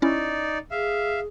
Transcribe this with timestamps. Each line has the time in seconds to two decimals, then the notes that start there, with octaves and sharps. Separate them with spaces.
0.02 C#4 D#4 E4 D5
0.71 G#4 E5 F5